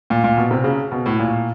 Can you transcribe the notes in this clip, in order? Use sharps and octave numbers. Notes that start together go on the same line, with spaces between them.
A#2
A#2
B2
C3
C#3
B2
A2
A#2